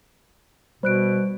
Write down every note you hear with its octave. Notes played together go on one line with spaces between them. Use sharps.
B2 G3 C5 F#6 D7